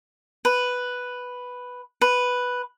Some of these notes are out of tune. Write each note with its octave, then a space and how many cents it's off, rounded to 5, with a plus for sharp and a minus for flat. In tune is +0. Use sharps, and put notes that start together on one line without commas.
B4 +0
B4 +0